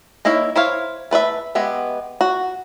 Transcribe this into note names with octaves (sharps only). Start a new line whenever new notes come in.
A#3 D#4 E4 C#5 E5
E4 C5 C#5 F5
A3 B4 C#5 E5
G#3 B3 G4 E5
F#4